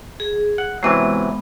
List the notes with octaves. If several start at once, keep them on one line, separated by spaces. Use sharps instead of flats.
G#4
F#5
C3 E3 F#3 G#3 B3